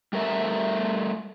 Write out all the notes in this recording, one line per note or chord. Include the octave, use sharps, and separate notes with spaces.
G3 A3 A#4 E5